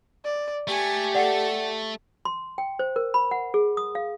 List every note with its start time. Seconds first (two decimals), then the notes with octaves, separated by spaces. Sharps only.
0.25 D5
0.68 A3 G4 G#5
1.15 A4 D5 F#5
2.25 C6
2.58 G5
2.79 C5
2.96 A#4
3.14 B5
3.31 F#5
3.54 G#4
3.77 D#6
3.95 F5